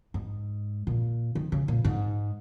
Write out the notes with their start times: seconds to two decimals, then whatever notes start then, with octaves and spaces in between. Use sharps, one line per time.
0.14 G#2
0.87 A#2
1.35 D#3
1.52 C#3
1.68 A#2
1.84 G#2